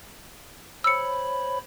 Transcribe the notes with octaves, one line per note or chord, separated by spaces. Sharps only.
C5 C#5 B5 E6 C#7